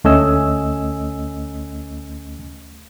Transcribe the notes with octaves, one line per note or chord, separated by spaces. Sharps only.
D2 A3 C#4 D#5 G#5 E6